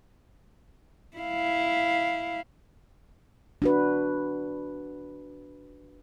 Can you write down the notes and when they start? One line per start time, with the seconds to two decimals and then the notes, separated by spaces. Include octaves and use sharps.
1.17 E4 F5
3.62 D4 F#4 B4